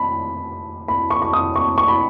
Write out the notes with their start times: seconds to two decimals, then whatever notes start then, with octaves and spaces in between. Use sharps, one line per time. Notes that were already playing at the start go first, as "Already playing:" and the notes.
Already playing: B5
0.88 B5
1.10 C#6
1.22 C#6
1.33 D#6
1.56 C#6
1.78 C#6
1.88 B5